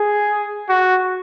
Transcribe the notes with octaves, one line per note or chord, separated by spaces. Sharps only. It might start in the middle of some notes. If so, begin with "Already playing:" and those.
Already playing: G#4
F#4